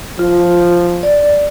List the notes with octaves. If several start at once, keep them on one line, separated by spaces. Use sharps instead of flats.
F3 F4
D5